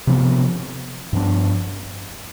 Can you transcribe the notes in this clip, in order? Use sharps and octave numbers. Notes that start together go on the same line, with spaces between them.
C3 F3 B3
G2 F3 B3 D4